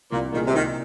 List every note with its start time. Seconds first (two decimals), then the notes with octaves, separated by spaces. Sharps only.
0.12 C2 A#2
0.32 A#2 D#3 A#3 G#4
0.45 C3
0.54 C2 D#3